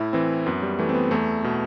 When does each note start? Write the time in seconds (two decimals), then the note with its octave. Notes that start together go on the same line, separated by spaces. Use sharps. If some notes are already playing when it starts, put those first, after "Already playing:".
Already playing: A2 E4
0.13 E3 C4
0.46 F#2 B3
0.63 G3
0.79 E3 A3
0.89 C4
0.94 B3
1.11 E2 A3
1.44 B2